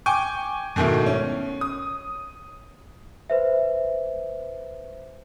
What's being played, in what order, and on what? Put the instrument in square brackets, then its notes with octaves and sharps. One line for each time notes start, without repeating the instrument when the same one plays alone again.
[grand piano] G5 G#5 C#6 D6
G#2 B2 D#3 A3 E4
C#4
D#6
[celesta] B4 C5 E5